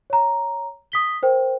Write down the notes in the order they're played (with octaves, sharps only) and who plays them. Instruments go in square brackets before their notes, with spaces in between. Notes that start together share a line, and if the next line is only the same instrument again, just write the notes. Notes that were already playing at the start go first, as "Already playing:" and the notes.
[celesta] C#5 A#5
D#6 B6 G7
A#4 C5 G5